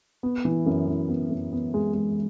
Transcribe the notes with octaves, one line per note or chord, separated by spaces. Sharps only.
B3
E3
F#2
E3
B3
F#2
B3
G#3
G#3